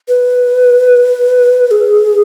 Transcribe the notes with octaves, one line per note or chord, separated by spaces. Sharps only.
B4
B4
G#4